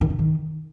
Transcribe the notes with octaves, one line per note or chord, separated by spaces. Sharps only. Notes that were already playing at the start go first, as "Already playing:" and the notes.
D#3
C#3
D#3